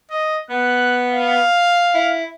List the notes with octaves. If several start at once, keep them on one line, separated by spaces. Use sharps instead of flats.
D#5
B3 F#6
F5
E4